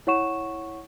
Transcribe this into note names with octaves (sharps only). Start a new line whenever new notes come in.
E4 C#5 F#5 C#6 E7